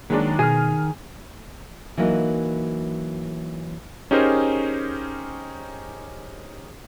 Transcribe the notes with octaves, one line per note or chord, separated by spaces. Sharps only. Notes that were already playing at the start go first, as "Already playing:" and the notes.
D#3 F#3 G#3 A#3 D4
B2 G#4 F6 D#7
E3 F#3 A#3 D#4
C#4 D#4 G4 G#4 A#4 C5